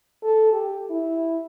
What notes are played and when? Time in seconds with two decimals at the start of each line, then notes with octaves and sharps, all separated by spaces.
0.24 A4
0.53 G4
0.91 E4